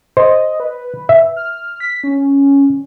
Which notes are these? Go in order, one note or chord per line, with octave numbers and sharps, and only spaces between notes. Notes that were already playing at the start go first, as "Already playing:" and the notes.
C5 D#5
B4
E5
F6
B6
C#4